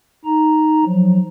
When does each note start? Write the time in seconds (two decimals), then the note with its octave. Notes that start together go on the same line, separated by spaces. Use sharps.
0.25 D#4 A#5
0.85 F3 F#3